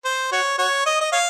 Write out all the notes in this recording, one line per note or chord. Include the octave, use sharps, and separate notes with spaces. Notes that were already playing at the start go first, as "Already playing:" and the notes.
C5
F#4 C#5
F#4 C#5
D#5
D#5
C#5 F5